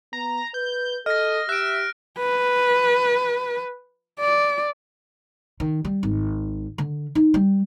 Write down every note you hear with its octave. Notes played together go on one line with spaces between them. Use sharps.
B3 A#5
B4 G6
A4 D#5 F6 A#6
G4 E5 F#6 D7
B4
D5
D#3
G3
G#1
D3
D#4
G3